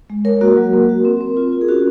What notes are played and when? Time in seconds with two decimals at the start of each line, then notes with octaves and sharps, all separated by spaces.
0.10 G#3
0.25 G#3 A#4 C#5
0.41 A#3 F#4 A#4
0.57 F#3
0.73 A#3
0.89 F#4
1.05 C4
1.21 C4
1.37 F4
1.53 F4
1.61 G#4
1.68 C#4 F#4 A#4